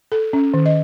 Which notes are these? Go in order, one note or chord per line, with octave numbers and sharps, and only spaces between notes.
A4
C#4
D#3
D#5